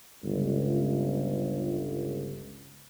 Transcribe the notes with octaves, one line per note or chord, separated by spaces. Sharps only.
G1 C#2